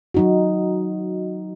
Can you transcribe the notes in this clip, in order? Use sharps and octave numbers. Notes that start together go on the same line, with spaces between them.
F#3 D#4 F#4